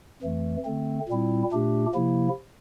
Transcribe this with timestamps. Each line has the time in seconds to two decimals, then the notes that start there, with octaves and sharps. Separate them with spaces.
0.22 F2 E3 A3
0.65 D3 A3 C4
1.08 A#2 G3 C4 E4
1.52 A#2 A3 D4 G4
1.94 C3 F3 A#3 E4